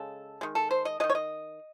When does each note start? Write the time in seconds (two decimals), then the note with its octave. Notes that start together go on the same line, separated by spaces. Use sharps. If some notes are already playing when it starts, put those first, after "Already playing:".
Already playing: C#3 G#3 A4
0.41 D#3 G#3
0.55 A4
0.71 C5
0.85 D#5
1.00 D#3 G#3 D#5
1.10 C#5
1.15 D#5